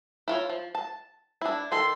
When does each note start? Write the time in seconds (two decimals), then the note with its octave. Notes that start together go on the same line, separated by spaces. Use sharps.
0.28 E4 F4 C#5
0.50 F3
0.75 A5
1.41 D4 E4
1.72 D#3 A4 C6